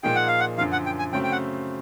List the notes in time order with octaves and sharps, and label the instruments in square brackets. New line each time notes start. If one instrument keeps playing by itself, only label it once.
[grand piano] A#2 F3 A#3 D#4 G#4 [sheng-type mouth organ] G5
[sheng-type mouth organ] F#5
F5
F#5
[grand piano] F#2 D3 F3 [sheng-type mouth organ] F5
[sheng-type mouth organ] F#5
G5
G#5
[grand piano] C#3 F#3 A3 C4 [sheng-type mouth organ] G5
[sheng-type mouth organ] G5
F#5